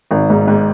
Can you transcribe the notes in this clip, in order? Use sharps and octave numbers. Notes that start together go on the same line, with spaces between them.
G#1
G#2
G#2